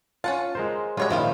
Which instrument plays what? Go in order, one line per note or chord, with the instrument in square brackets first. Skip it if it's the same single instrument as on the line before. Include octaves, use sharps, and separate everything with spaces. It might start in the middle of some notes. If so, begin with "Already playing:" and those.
[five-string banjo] C#4 F#5 A5 [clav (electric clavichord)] F4
[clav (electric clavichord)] G#3 A#4 C5
[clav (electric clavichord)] G3 G#3 F#4 [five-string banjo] F4 C#5 E5
[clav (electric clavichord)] A#2 D#3 F3 [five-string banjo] E4 F4 F5